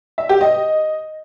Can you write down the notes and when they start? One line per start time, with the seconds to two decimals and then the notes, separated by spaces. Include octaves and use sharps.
0.18 E5
0.29 G4
0.41 D#5